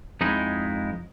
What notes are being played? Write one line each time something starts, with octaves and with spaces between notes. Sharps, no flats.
F2 G#3 D#4 E4 G#4